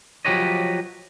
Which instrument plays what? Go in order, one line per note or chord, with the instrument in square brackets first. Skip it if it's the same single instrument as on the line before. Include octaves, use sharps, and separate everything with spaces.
[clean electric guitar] F3 F#3 G4 B4 C#5 D#5